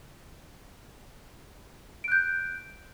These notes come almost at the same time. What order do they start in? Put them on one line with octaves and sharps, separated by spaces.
D7 F#6 G6